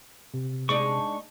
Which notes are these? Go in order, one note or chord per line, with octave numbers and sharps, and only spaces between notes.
C3
G#3 D4 D#4 C#6